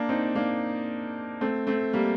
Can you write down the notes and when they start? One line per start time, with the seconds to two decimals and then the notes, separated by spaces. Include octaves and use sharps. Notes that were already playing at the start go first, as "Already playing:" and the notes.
Already playing: A#3 D4
0.09 C4 D#4
0.35 A#3 D4
1.41 A3 C4
1.67 A3 C4
1.93 G3 A#3